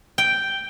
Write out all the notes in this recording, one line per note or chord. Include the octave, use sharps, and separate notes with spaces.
G5